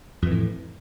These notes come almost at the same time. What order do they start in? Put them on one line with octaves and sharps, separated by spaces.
F2 E3 A2